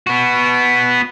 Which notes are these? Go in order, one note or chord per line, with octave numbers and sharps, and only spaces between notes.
B3 F#4